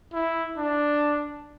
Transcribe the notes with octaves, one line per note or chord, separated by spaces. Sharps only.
E4
D4